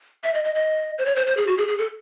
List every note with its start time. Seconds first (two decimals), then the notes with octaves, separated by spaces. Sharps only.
0.24 E5
0.34 D#5
0.44 D#5
0.55 D#5
0.98 C5
1.06 C#5
1.16 C5
1.27 C5
1.37 G#4
1.47 F#4
1.58 G#4
1.68 G#4
1.78 A4